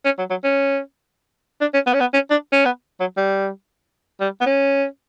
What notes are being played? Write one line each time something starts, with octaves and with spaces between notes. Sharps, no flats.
C#4
F#3
F#3
C#4
D4
C#4
B3
C#4
B3
C#4
D4
C#4
B3
F#3
G3
G3
B3
C#4